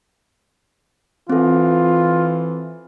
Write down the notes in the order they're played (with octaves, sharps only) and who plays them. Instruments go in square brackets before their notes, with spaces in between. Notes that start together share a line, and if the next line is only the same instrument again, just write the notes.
[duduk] E3 [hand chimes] C4 A4 [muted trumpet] F4